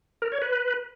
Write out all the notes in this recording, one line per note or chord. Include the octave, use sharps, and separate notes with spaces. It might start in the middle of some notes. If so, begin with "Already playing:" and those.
A#4
C#5
B4